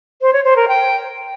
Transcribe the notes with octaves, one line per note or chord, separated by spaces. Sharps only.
C5
C#5
C5
A#4
G5